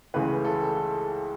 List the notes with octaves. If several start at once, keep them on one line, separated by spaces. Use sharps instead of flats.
C#2 C#3 E3 A3 B4
A4
A4